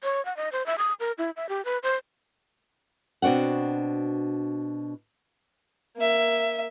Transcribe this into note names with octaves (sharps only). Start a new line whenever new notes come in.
C#5
F#5
D#5
C5
E5
D#6
A#4
E4
E5
G4
B4
C5
B2 C4 D4 F#4 F#5
A#3 E5